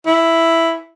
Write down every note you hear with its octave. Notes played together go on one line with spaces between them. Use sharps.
E4